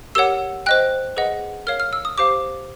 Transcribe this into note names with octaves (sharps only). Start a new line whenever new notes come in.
G4 A#4 C#5 F#5 E6
C5 D#5 G5 F#6
G#4 B4 D#5 F#5
A#4 C#5 F5 F6
F6
E6
D#6
G4 C5 F5 D6